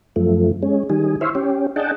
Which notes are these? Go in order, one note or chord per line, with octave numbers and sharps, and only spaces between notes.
F#2 F3 A3
G#3 C#4
D#3 G3 G#4
E4 C5 C#5 E5 F5
C#4 G4
D4 G#4 D#5 F#5 G5 A5